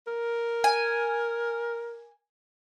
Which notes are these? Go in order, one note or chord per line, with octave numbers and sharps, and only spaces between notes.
A#4
G#5